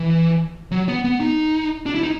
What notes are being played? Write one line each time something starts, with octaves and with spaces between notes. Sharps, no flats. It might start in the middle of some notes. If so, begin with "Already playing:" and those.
Already playing: E3
F#3
B3
B3
D#4
D4
E4
D#4